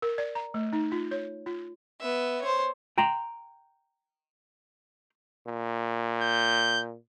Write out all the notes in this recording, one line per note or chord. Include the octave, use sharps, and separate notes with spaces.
A#4
D5
A#5
A3
D#4
F4
C#5
F4
B3 E5
C5 C#5
G5 A#5 C6
A#2
G6